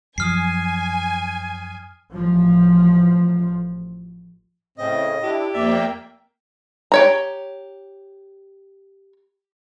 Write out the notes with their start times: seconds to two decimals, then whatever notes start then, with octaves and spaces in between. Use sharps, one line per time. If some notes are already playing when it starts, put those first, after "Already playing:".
0.18 F#2 F3 G#5 D#6 F6 C7
2.12 A1 F3
4.78 A2 C#3 C4 D#5
5.23 D4 E4 G4
5.54 F2 A#3 D5 E5 G5
6.92 G4 C#5 A#5